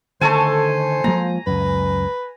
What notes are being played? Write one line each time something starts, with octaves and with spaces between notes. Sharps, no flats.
D3 D#3 A3 A4 C5 G#5
F3 G#3 A#3 A#5
C#2 F#2 B4